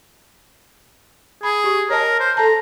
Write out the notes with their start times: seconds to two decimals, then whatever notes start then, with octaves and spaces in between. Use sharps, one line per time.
1.43 G#4 B5
1.64 G4 C#6
1.90 A#4 C#5 D#5 A5
2.20 C5
2.37 A4 A5 A#5